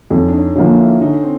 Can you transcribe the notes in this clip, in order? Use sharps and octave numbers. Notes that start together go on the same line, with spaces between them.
F2 C#4 D#4
D4
C#4 D#4
D3 F3 A#3 C#4 D#4
D4 E4
D3 C#4 D#4
C4